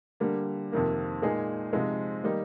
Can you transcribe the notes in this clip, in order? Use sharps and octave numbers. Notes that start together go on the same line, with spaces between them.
D3 G3 A#3
F2 C3 D#3 A#3
A#2 G#3 D#4 G#4
C3 F3 G#3 D#4
D#3 G3 A#3 D#4